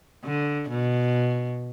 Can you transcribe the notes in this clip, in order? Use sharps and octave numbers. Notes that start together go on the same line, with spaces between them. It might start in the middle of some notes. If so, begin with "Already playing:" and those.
D3
B2